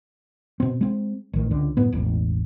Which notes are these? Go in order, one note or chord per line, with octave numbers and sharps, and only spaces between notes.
B2 C4
G#3 C4
A1 D#3
C#2 D3
F#1 A2 B3
E1 A1